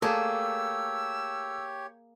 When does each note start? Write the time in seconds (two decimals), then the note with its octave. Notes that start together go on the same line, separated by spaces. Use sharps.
0.02 A3 A#3 G4 G#4 C#5 A5 E6